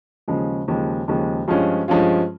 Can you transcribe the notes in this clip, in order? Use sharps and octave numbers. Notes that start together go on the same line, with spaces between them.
D#2 C#3 F3 G#3
D#2 C#3 F3 G#3
D#2 C#3 F3 G#3
G2 F3 G#3 C#4 F4
G2 F3 G#3 C#4 F4